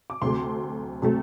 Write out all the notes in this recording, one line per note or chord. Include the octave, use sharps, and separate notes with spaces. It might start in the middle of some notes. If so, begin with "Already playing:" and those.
D6
D2 C3 F#3 A3 C6
C3 F#3 A3